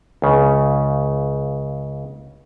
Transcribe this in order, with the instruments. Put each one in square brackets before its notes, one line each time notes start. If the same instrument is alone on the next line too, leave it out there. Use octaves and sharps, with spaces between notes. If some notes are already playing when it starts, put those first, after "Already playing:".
[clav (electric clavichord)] C#2 C#3